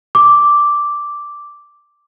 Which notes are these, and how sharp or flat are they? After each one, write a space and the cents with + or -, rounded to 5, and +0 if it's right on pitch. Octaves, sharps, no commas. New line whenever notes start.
D6 -5